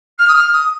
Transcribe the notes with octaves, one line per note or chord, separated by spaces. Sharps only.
F6
D#6
F6
D#6